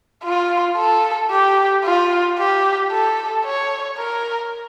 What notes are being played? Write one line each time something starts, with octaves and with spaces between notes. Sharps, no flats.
F4
A4
G4
F4
G4
A4
C#5
A#4